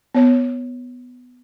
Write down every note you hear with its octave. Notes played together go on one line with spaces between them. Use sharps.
B3 C#5